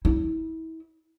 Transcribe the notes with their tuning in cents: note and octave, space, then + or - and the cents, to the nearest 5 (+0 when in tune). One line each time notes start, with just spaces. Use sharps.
E4 -35